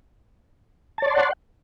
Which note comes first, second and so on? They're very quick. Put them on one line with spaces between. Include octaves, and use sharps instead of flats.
A5 C#5 D5 C6 F#5